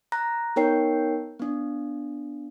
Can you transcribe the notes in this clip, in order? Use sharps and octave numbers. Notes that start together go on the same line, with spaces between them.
A#5 F#6 A#6
B3 D#4 A#4 C#5 G5 C7
B3 D4